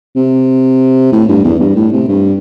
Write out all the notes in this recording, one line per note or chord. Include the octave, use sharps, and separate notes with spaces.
C3
A2
G2
E2
G2
A2
C3
G2